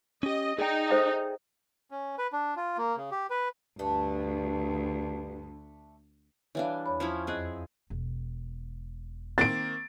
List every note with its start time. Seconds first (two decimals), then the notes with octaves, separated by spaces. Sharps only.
0.23 C#4 G4 D#5
0.59 D#4 G#4 D5 G5
0.91 A4 C5 E5
1.91 C#4
2.18 B4
2.33 D4
2.56 F4
2.77 A#3
2.96 C#3
3.11 G4
3.30 B4
3.79 D2 G2 A3 D4
6.55 E3 G3 D4 C#5 E5 F5
6.86 E2 C#5 B5
7.00 F3 C#4 E4
7.27 F2 C4 G#4 D#5 F#6
7.90 E1
9.38 D#3 A#3 C4 A6 D7